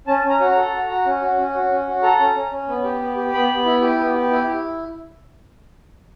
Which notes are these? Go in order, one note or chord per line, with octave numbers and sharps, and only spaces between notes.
C#4 A5
C#4
A#5
F#4
A#5
A4
F#4
F#4
C#4
F#4
C#4
F#4
C#4
F#4
A4 A#5
C#4
C#4
C#4
B3
G4
B3
G4
B3 B5
B3
E4
G4
B3
G4
E4
E4